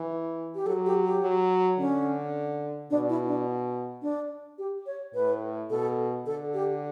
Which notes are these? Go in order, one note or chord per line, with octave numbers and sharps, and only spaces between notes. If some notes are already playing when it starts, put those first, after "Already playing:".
Already playing: E3
G4
F#3 A4
G4
G4
F#3
D3 C#4
B2 D4
E4
D4
D4
G4
C#5
A2 B4
B2 A4
D3 A4
G4